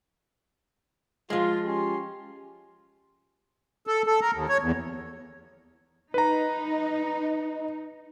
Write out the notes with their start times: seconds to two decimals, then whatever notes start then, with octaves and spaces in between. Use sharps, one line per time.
1.30 F3 G#3 F4
1.65 C#4 G4 C6
3.87 A4
4.06 A4
4.21 A#4
4.34 D#2
4.49 C#5
4.61 E2
6.14 D#4 B4 A#5